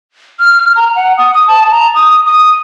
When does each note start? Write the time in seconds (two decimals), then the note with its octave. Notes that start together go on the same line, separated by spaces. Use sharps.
0.40 F6
0.76 A#5
0.96 F#5
1.18 D#6
1.33 D#6
1.48 A5
1.71 A#5
1.95 D#6
2.26 D#6